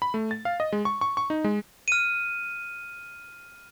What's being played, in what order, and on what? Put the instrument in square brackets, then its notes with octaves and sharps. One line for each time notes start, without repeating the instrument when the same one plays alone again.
[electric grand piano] B5
A3
A6
F5
D#5
G#3
C#6
C#6
C#6
D#4
G#3
[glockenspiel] F6 D#7